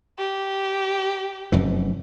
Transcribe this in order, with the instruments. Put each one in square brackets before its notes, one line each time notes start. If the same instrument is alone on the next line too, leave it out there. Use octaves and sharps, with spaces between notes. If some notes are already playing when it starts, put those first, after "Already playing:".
[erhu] G4
[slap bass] F1 F#2 E3